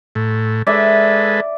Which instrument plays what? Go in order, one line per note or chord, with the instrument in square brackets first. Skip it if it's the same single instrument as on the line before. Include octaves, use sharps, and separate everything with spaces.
[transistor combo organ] A2
[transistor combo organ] G#3 A4 B4 [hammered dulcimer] D5 E5